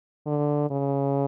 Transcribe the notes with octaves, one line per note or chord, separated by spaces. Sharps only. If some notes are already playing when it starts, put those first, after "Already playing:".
D3
C#3